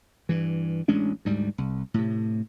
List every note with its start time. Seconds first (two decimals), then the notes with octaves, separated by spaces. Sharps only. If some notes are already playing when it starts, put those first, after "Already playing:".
0.29 G2 E3
0.88 A1 G#3 C#4 D4
1.25 D2 G#2 G3
1.58 C2
1.94 A2 C3